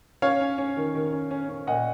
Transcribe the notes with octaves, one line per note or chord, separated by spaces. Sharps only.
C#4 C#5 F5
C#4
C#4
D#3
D#3
C#4
C#4
C#4
A#2 D#5 F#5